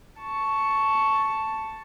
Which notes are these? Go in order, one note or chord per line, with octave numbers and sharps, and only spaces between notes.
A5 C#6